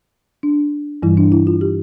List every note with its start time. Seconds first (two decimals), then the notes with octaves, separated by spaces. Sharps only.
0.43 D4
1.03 G2 E3 G3 E4
1.17 D4
1.32 E4
1.47 F4
1.61 G4